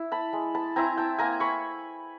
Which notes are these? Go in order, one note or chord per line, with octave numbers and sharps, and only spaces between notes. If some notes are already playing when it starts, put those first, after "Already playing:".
Already playing: E4
A5 B5
G#3
A5 B5
C4 E4 G#5 A#5
G5 A5
A#3 G#5 A#5
B5 C#6